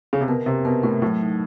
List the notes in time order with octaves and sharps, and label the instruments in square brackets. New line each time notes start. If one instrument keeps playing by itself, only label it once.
[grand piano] C#3
C3
[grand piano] B2 [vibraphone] A#4
[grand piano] C3 [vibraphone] A#4
[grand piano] B2 [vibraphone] A#4
[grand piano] A2 [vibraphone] A#4
[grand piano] A2 [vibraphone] F#3
[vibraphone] D#4